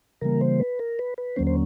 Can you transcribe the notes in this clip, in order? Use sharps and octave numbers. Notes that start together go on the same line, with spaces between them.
C#3 E3 G3 A#3 A#4
C5
B4
A#4
B4
B4
D#2 D3 F#3 A#3 C#4 C5
C5